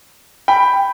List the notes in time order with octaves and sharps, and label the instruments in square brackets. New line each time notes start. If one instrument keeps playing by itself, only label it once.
[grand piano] G5 B5